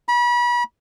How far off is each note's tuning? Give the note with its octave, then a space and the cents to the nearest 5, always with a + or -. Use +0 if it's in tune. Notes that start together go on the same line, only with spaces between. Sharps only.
B5 -35